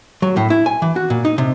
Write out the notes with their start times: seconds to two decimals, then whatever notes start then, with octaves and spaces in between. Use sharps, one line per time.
0.22 F#3
0.37 A2
0.50 E4
0.66 G#5
0.82 E3
0.96 F#4
1.10 A#2
1.25 D#4
1.38 C3